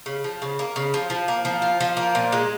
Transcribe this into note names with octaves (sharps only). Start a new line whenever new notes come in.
C#3
F3
C#3
A#3
C#3
F3
F3
A#3
F3
F4
F3
A#3
A#2
G#3